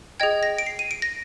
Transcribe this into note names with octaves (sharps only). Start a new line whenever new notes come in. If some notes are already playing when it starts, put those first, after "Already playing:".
G#4 D#5 G5 G#6
A#6
D7
C7
D#7
D7
A#6